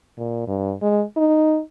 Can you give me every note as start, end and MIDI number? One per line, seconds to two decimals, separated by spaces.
0.18 0.43 46
0.47 0.73 43
0.82 1.03 56
1.17 1.60 63